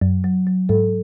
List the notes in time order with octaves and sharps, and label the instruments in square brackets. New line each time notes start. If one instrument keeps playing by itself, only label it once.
[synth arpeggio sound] F#2 [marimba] F#3
[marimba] F#3
F#3
[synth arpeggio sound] G#2 [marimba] A4